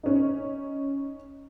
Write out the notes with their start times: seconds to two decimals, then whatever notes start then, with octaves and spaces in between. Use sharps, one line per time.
0.03 C#4 D#4